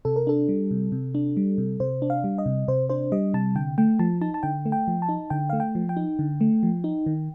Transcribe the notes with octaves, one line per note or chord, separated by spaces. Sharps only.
C3 A4
A#4
D4 A4
G3
C3
C3
D4
G3
C3
C3 C5
D4
F5
G3
D#5
C3
C3 C5
D4 C5
G3 D#5
C3 A5
D3 G5
A3 G5
F3 A5
D#4 A5
A5
D3 G5
A3
G5
F3
A5
D#4
D3 G5
A3 F5
G5
F3
G5
D#4
D3
A3
F3
D#4
D#3